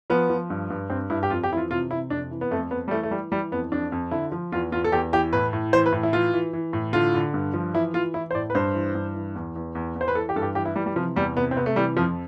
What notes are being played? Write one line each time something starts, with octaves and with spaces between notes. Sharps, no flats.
F3 B3
F3
G2
G2
G2 C4
G2 E4
G4
F2 F4
G4
E3 E4
F4
C3 F4
C3 E4
F2 D4
E3
B3
F2 A3
F2 B3
G3
E3 A3
A3
E3 G3
E3 G3
F2 B3
F2 D4
F2
D3 E4
F3
E2 F4
E2 F4
A4
E2 G4
E3 G4
A2 B4
A2
E3 C5
B4
A2
E4
E3 F4
E3
E3
A2
D3 F4
D3
G2
F3
E3 E4
E3 F4
E3 E4
C5
A2 D5
B4
G2 C5
E3
G2
E3
E2
E2
E2
E2
C5
B4
E3 A4
G4
G2 A4
G4
E3 G4
E4
E3 G3
G3
C3 F3
E2 G3
C3 B3
C4
C3 B3
A3
E3 G3
F2 F3